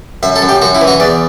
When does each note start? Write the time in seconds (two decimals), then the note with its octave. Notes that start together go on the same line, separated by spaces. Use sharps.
0.23 F#2 E5
0.36 A4
0.42 F#2
0.49 G4
0.62 F#2 F#4
0.75 E4
0.81 E3
0.88 F#4
1.00 E2 D5